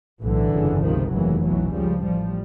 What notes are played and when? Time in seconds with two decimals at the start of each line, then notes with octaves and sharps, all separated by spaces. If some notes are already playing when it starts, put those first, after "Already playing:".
0.22 B1 A2 D3 E3
0.52 G1 F2 C#3
0.82 C#2 C3 D#3 F3
1.12 F1 D#2 C#3 E3 F#3
1.42 B1 B2 E3 F#3
1.73 C#2 C#3 F3 G3
2.03 A1 A2 F3 G3